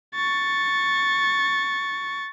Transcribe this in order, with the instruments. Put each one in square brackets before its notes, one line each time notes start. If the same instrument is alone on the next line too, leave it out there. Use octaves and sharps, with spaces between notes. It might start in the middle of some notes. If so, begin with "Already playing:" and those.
[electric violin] C#6 A6